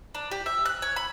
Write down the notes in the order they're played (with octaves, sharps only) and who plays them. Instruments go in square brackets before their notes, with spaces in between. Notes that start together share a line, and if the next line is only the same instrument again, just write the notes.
[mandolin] D4
G4
E5
F#6
C#5
B5